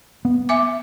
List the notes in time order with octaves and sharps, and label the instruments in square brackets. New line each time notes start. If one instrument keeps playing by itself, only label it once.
[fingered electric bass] B3
[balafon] E5 G#5 D6